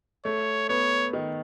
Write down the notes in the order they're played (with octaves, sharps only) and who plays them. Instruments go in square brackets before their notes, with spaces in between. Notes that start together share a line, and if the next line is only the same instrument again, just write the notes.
[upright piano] A3 [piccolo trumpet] C#5
[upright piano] B3 [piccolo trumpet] C#5
[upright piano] D#3